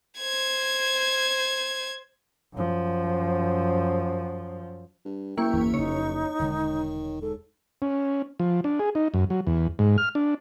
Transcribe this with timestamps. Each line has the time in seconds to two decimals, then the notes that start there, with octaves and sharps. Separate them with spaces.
0.18 C5 G#6
2.53 F#2 F3
5.05 G2
5.37 F#1 A#3 E4 G5 C#6
5.53 G1 E2 E3
5.74 F1 C#3 D#4 C#5
6.40 E1 D3 D#3 G#3
7.22 G#2 A4
7.82 C#4
8.40 F3
8.64 D4
8.79 G#4
8.95 D#4
9.14 F#2
9.30 F#3
9.47 E2
9.79 G#2
9.98 F6
10.15 D4